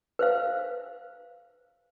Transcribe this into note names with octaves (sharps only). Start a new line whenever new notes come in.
B4 C5 F5